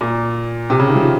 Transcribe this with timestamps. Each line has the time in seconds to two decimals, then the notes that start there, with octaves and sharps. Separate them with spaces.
0.01 A#2
0.70 C3
0.79 C#3
0.88 D#3
0.95 F3